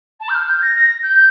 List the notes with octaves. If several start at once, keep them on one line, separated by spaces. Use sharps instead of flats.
A5
G6
F6
G6
A#6
A#6
G6